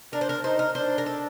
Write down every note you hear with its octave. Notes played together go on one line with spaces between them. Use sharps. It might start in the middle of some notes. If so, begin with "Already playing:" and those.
D4 A#4
C5
A#4
D#4 C5
A#4
D4 C5
A#4
A4